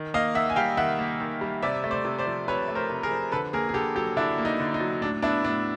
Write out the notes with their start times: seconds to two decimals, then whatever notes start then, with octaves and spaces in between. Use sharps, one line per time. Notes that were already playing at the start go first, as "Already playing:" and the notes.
Already playing: D#3
0.14 A#3 D#5 F5
0.35 D#3 E5 F#5
0.50 G#5
0.56 G3 F5 G5
0.77 D#3 E5 F#5
0.99 A#3
1.21 D#3
1.41 G3
1.62 C3 D5 E5
1.84 A3
1.91 C5 D5
2.05 C3
2.19 C5 D5
2.26 F3
2.48 C3 B4 C#5
2.68 A3
2.75 A#4 C5
2.90 C3
3.03 G#4 A#4
3.11 F3
3.32 D3 A4 B4
3.53 A#3 G#4 A#4
3.69 G#4
3.74 D3 G4 A4
3.96 F#3 G4 A4
4.17 D3 D4 E4
4.38 A#3
4.45 D#4
4.60 D3
4.74 D#4
4.80 F#3
5.02 A2 D4
5.22 B3 D4 E4
5.45 A2 D4